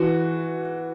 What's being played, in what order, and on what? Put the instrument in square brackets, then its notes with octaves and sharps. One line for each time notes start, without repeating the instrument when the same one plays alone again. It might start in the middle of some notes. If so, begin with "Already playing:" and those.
Already playing: [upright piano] E3 F#4